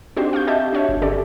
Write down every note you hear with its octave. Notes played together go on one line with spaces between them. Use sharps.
C4 D4 D#4 F#4 G4 C5
F5 C#6 G6
G4 D#5 E5 A5 G6
D4 F#4 C#5 E5
G1
D3 C#4 G4 A4 D5